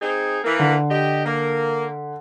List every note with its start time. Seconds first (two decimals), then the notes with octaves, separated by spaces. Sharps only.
0.01 C4 D#4 G#4
0.44 E3 A#3
0.59 D3
0.90 G4 D#5
1.25 A#3